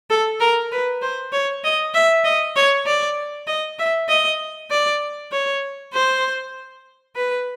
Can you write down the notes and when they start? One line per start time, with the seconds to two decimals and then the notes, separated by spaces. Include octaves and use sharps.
0.10 A4
0.40 A#4
0.72 B4
1.02 C5
1.32 C#5
1.64 D#5
1.94 E5
2.24 D#5
2.56 C#5
2.86 D5
3.47 D#5
3.79 E5
4.09 D#5
4.70 D5
5.31 C#5
5.94 C5
7.16 B4